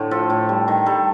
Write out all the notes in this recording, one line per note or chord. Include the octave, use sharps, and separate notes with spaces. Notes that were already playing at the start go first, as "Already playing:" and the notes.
Already playing: A2 D3 A3 C5
F3 A4
A2
G3
D#3
G3 A4